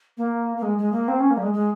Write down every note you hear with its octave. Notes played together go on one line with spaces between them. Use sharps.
A#3
A#3
G#3
G#3
A#3
C4
C#4
A#3
G3
G#3
G#3